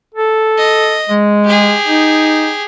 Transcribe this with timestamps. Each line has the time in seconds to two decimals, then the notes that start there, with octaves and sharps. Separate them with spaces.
0.15 A4
0.58 D#5
1.09 G#3
1.45 G4 G#4
1.87 D#4